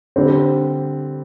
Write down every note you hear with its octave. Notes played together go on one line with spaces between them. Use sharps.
D3 G3 C4